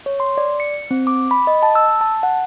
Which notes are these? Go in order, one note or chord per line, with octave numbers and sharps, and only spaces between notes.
C#5
C6
D5
C#7
C4
D6
B5
D#5
A5
E6
A5
F#5